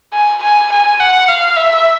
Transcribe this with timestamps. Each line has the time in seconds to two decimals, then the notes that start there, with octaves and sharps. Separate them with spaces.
0.13 G#5
0.42 G#5
0.72 G#5
1.00 F#5
1.28 F5
1.57 E5